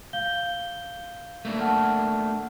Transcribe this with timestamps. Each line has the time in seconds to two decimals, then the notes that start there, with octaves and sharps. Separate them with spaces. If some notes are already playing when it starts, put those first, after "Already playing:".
0.13 F5 G6 G7
1.45 A3 A#3 D4
1.60 F#5 A5 F6